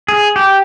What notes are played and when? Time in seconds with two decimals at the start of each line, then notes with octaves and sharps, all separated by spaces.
0.08 G#4
0.36 G4